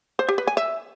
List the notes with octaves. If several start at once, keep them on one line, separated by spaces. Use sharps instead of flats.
C5
G4
B4
G#5
E5